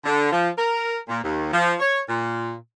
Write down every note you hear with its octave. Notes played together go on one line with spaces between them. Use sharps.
D3
F3
A#4
A#2
D#2
F3
C#5
A#2